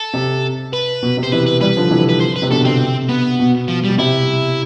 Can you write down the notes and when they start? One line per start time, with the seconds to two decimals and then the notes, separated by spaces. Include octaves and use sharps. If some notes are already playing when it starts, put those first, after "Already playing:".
Already playing: A4
0.14 C3
0.73 B4
1.03 B2
1.17 C3
1.23 C5
1.32 C3 E3 B4
1.46 B4
1.61 E3 G3 B4
1.77 D3 F3
1.91 C3 E3
2.09 B4
2.21 C5
2.36 B4
2.42 C3
2.50 B2 D3 A4
2.65 C3 C4
3.09 B3
3.39 B2
3.68 F3
3.84 G3
3.89 B2
3.98 C3 E4